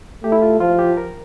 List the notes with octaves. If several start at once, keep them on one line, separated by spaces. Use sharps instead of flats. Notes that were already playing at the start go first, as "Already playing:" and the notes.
A3 G4
E4
F4
F3 F4
G4
A#4